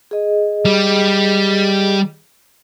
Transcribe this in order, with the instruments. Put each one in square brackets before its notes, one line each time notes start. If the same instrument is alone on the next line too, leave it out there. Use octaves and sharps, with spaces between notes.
[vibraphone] G#4 D#5
[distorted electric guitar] G3